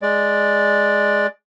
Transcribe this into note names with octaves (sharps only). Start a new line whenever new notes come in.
G#3 D5